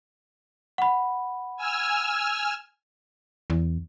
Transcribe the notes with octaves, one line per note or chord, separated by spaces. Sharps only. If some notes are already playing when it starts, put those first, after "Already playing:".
F#5 B5
G#5 E6 F6
E2